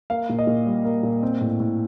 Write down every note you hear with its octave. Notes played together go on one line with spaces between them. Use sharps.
A#3 F5
A#2
D#5
A#2
G3
A#3
A#2
C4
A2
A2